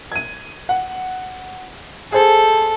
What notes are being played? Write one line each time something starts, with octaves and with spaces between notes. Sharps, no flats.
G#6 D#7
F#5
G#4 A4 C5